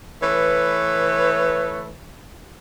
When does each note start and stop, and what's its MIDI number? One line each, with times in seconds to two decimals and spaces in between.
0.22 1.92 52
0.22 1.92 57
0.22 1.92 71
0.22 1.92 73